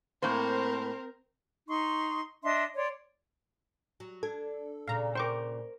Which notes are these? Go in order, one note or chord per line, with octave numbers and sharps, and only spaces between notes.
A2 A#3 C4 A#4 C5
D#4 C6 C#6
D4 D#5 E5 C6
C#5 D5 C6
F#3
D4 A4 G#6
A#2 C#3 F5 A#5
A#4 C5 G5 C#6 D6